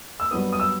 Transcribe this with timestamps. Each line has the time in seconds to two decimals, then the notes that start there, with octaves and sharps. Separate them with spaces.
0.20 E6
0.31 G2 F#3 B3 D#6
0.53 D#6
0.60 E6